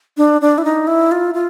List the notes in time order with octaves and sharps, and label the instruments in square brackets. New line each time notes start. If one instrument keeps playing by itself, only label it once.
[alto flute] D4
D4
E4
D#4
E4
F4
F4